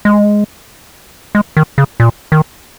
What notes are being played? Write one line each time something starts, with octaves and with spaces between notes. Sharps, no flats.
G#3
G#3
D#3
C#3
A#2
D#3